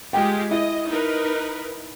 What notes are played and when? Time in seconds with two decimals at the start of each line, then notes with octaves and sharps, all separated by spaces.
0.13 G#3 F4 G4 G5
0.51 E4 D#5
0.88 D#4 A#4 B4